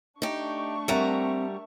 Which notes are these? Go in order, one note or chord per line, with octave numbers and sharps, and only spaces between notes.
A3 D4 D#4 G4 C#6
G3 C4 A#4 E5 F#5 A#5